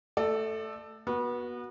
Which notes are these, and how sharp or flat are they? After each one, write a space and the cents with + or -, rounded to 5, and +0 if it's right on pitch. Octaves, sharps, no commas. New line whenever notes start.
A3 +0 A4 +0 D5 +35
B3 -25 F#4 +0